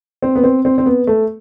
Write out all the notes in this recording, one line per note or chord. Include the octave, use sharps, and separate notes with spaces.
C4
B3
C4
C4
C4
B3
A3